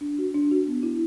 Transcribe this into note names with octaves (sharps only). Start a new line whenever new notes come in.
D4
F#4
D4
F#4
B3
E4